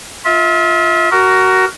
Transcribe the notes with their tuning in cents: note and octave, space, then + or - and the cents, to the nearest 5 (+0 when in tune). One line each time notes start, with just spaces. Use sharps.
F4 +0 E5 -35
F#4 +20 A#4 +0